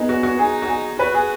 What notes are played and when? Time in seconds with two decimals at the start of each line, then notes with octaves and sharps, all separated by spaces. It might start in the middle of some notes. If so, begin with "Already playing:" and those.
Already playing: B3 D#4 G#4
0.09 F#4
0.23 F#4
0.39 D#4 G#4
0.62 F#4
0.68 G#4
0.99 F#4 B4
1.14 G#4